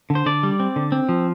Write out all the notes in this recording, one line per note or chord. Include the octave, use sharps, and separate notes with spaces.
D3
C5
D3 D5
G3
C4
D3
C4
F3